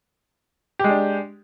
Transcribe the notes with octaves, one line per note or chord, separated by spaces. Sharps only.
G#3 D4 G4